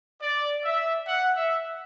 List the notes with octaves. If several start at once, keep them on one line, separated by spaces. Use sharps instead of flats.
D5
E5
F#5
E5